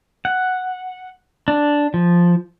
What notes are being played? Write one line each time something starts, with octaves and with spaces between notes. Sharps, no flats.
F#5
D4
F3